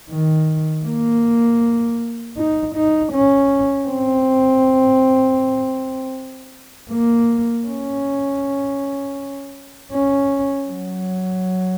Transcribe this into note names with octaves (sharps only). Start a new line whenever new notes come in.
D#3
A#3
D#4
D#4
C#4
C4
A#3
C#4
C#4
F#3